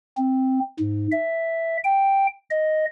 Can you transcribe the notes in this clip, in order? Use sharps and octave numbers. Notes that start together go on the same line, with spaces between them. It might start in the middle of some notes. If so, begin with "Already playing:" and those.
C4
G#2
E5
G5
D#5